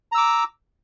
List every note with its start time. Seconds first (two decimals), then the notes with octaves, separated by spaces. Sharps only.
0.12 A#5
0.15 E6
0.18 D6